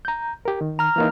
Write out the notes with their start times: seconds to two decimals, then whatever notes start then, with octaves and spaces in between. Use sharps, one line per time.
0.05 A#5 G6
0.45 G4 A#4
0.61 D#3
0.79 A#5 F6
0.96 E3 A#3 D#4